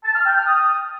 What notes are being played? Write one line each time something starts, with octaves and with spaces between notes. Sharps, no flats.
A5
F6
G5
F6
D#6